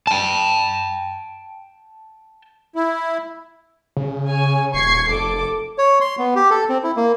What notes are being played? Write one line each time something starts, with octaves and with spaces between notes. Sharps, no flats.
G5 A5
E4
C#3
C#5 G#5
D#1 C#6 G#6 C7
F1 A4 D6
C#5
C6
B3
G4
A4
C4
E4
A#3